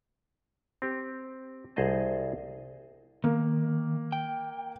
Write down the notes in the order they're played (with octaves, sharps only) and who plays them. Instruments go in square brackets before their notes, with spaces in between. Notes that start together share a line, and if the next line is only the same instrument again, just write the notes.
[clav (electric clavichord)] C4 G4
C2 G#4 C5 D#5 A5
[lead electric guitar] D#3 [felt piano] A#3
[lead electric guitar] G5